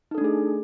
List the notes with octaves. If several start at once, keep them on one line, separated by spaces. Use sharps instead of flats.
A3 D4 D#4 G#4 A4